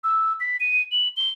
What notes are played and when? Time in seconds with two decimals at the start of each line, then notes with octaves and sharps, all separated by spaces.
0.04 E6
0.40 B6
0.60 D#7
0.91 F#7
1.17 G7